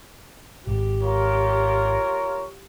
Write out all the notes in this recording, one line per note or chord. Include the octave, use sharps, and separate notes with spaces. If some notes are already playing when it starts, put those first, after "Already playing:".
G#1 G4
F4 A#4 C#5